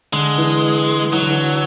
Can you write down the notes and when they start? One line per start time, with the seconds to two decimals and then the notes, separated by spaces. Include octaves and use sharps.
0.13 D3 G#3
0.38 E3
1.13 E3 F#3
1.22 D3
1.31 E3